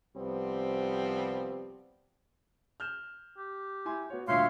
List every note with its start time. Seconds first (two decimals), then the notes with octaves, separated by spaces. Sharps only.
0.16 C2 F3 G3 B3 C4
2.80 F6 G6 E7
3.38 G4
3.85 E4 G#5 C6
4.10 B3 F#4 C#5
4.28 D2 G2 A#2 C#5 E5 F5 C6